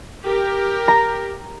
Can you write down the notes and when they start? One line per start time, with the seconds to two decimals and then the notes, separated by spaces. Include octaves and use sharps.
0.25 G4 A#4
0.88 A#5